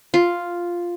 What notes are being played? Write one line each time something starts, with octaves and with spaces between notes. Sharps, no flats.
F4